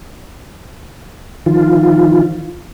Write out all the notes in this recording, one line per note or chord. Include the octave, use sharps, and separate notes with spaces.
D#3 F3 F4